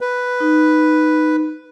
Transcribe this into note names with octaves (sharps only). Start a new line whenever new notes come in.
B4
D#4